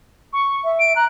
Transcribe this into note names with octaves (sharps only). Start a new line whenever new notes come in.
C#6
E5
D7
A#5 F#6